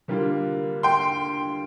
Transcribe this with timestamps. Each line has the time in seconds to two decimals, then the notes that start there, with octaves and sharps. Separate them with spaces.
0.08 D3 G3 A#3 F4
0.83 G5 C6